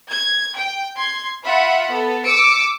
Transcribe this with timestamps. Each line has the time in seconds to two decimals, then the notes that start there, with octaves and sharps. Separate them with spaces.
0.11 G#6
0.56 G5
0.97 C6 G#6
1.44 F4 E5 F#5 B5
1.90 B3 A4
2.24 D6 E6 C#7 D7